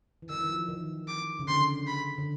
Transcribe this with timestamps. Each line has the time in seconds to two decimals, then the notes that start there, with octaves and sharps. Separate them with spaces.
0.22 E3
0.30 D#3 E6
0.39 E3
0.50 F3
0.69 D#3
1.08 D6
1.39 C#3
1.48 D3 C6
1.87 B5
2.18 D3